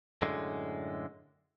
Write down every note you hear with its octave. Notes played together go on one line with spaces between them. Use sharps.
F#2 A2 D3 G#3